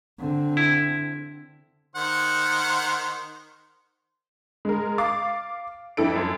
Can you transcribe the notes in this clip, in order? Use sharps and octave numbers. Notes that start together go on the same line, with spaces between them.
D3 C4
E4
D#3 C5 F#5
G#3 A#4
F5 D6 A6
F2 E4 A4 D7
F#2